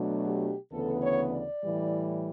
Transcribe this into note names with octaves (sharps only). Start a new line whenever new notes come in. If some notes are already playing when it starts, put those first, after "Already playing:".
Already playing: B2 F#3 A3 D4
G4
D2 C#3 E3 B3 A4
C#5
D5
A2 E3 G3